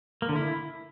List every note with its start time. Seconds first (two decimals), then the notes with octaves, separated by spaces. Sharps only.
0.22 A#3
0.29 D3
0.36 E4